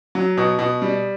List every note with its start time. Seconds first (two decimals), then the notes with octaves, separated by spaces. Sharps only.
0.15 F#3
0.37 B2
0.59 B2
0.82 G3